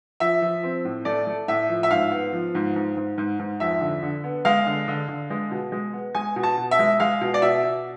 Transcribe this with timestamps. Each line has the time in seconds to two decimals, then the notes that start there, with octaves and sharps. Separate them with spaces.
0.20 F3 E5
0.42 F3
0.63 C4
0.85 A2
1.05 A3 D5
1.27 A3
1.48 A2 E5
1.69 F3
1.83 E5
1.91 G#2 F5
2.11 B3
2.33 F3
2.55 G#2
2.76 G#2
2.97 G#2
3.18 G#2
3.39 G#2
3.60 F2 E5
3.81 D3
4.03 D3
4.24 B3
4.45 G#3 F5
4.66 D3
4.88 D3
5.09 D3
5.30 G#3
5.51 B2
5.72 G#3
5.93 B3
6.15 G#3 G#5
6.36 B2
6.43 A5
6.57 B2
6.71 E5
6.79 G#3
7.00 G#3 F5
7.21 B2
7.34 D5
7.42 B2 E5
7.64 B2